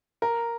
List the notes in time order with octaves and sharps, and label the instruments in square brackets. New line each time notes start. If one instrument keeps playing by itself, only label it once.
[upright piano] A#4